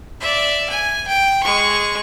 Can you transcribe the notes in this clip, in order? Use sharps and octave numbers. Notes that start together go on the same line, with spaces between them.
D5 E5
G#5
G5
G#3 C#6